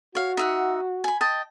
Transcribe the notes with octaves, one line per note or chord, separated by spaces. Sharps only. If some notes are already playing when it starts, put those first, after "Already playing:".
F#4 C#5 F5
D#4 E5 F#5
G#5 B5
D#5 G5 A5